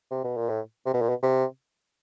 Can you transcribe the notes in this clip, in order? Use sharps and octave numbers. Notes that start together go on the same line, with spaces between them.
C3
B2
A#2
A2
C3
B2
A#2
B2
C3